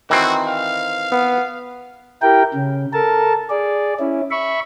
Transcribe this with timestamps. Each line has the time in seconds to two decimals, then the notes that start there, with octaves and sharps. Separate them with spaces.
0.10 D#3 E3 C4 F#4
0.48 F5
1.12 B3
2.22 E4 G4 A#4 G5
2.54 C#3
2.93 A4 A#4 A5
3.50 G#4 D5
4.00 C#4 E4
4.31 E5 B5 C#6